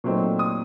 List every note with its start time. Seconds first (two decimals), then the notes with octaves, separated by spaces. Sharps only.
0.04 A#2 F#3 A3 C4 D#4
0.39 D#6